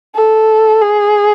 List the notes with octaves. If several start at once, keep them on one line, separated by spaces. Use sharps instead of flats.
A4
G#4